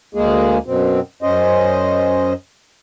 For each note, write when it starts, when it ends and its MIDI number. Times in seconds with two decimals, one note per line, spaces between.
0.15 0.58 38
0.15 0.58 56
0.15 0.58 58
0.15 0.58 68
0.66 1.00 42
0.66 1.00 47
0.66 1.00 60
1.22 2.33 42
1.22 2.33 61
1.22 2.33 72
1.22 2.33 75